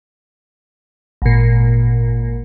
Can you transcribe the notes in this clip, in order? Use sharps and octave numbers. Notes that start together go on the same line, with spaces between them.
G#1 A#2